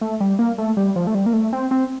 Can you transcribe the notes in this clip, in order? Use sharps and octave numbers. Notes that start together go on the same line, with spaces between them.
A3
G3
A#3
A3
G3
F3
A3
G3
A#3
A3
C4
C4